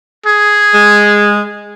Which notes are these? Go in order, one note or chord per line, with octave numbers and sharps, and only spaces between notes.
G#4
G#3